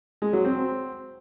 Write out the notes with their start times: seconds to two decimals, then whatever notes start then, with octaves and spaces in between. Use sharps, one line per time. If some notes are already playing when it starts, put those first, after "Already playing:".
0.22 G#3
0.33 F#3
0.45 C4